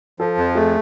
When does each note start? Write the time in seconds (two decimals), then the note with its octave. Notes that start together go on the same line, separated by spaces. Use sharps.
0.19 F3 A4
0.38 F2
0.55 A3 G#4